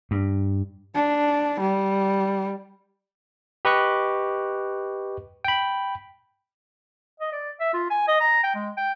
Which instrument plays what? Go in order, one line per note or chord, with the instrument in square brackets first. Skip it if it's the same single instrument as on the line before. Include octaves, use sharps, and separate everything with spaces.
[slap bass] G2
[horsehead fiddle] D4
G3
[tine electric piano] G4 B4 D#5 C#6 F#6
G5 B5
[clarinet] D#5
D5
E5
F4
G#5
D#5
A#5
G5
G#3
G5